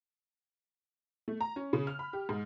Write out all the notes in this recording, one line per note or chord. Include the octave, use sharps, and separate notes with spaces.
A3
A#5
C#4
C#3
F6
B5
G4
G#2